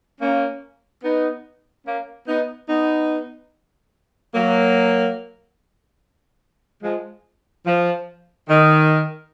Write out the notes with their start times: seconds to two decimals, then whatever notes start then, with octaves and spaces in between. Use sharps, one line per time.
0.21 A#3 C#4
1.04 B3 D#4
1.86 A#3 C#4
2.28 B3 D#4
2.69 B3 D#4
4.35 F#3 A#3
6.83 F3 G#3
7.66 F3
8.49 D#3